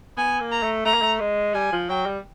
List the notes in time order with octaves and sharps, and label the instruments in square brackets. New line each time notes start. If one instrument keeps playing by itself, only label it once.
[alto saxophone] B3 [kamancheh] G#5
[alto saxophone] A#3
[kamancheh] A#5
[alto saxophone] A3
[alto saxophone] A3 [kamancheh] A#5
[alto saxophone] A#3
A3
G#3
[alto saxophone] G3 [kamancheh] G#5
[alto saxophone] F3
[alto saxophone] F#3 [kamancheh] G5
[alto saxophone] G3